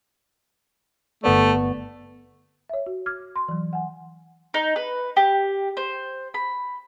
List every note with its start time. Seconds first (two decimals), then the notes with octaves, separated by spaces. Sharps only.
1.24 G1 A3 B3 D5
2.69 C#5 E5
2.86 F#4
3.06 D6 F6 G#6
3.36 C6
3.48 E3 F#3
3.73 F#5 G#5
4.54 D#4
4.76 B4
5.17 G4
5.77 C5
6.34 B5